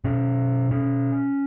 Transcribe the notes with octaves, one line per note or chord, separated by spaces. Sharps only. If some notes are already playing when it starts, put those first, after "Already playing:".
B2 C#4
C#4